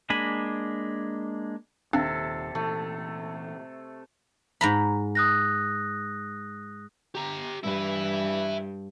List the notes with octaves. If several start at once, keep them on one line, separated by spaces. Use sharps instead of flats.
G#3 A#3 D4 G#5 B5
D#1 C3 D#3 C4 D4 A4 F5
A#2 E3 A3
G#2 A#5 B5
D#6 F#6 A#6
G4 A#5
G2 E4 B4